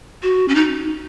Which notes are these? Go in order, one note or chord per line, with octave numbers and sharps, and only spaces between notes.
F#4
C#4
D#4